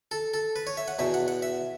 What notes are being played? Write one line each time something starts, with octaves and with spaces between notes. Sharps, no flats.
A4
A4
B4
C#5
E5
F#5
E2 B2 E5
F#5
F#5
E5